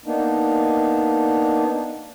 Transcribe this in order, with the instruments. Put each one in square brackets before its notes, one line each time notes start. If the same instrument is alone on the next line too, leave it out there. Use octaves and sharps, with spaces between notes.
[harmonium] A#3 B3 D4 D#4